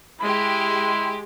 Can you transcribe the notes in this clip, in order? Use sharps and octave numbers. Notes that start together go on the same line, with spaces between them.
G#3 E4 G4 C6